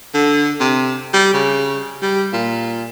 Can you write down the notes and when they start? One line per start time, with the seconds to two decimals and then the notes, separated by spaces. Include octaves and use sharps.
0.14 D3
0.60 C3
1.13 G3
1.34 C#3
2.02 G3
2.33 A#2